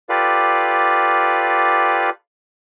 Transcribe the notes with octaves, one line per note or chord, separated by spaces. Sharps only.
F4 G4 A4 B4 D5 F5